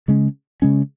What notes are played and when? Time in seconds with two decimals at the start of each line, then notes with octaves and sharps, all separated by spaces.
0.08 C#3 G#3 C#4
0.62 C#3 G#3 C#4